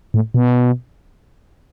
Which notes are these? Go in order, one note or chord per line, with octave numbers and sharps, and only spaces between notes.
A2
B2